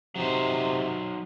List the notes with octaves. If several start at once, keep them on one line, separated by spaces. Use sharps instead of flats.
C3 F#3 D#4 C5